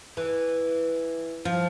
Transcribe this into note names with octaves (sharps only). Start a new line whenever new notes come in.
E3
F3